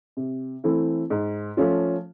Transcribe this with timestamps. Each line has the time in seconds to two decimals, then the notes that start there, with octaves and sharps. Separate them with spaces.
0.17 C3
0.64 E3 A3 C4 E4
1.10 G#2
1.57 F3 A3 C#4 F4